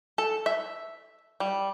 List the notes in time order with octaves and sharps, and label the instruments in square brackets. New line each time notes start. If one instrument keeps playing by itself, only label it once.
[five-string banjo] A4
E5
G3